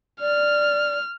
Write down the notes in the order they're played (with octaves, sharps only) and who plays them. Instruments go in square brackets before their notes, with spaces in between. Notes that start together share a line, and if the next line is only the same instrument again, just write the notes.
[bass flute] D5 [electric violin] F6